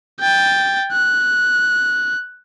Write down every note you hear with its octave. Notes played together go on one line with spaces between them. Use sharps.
G5 A6
F#6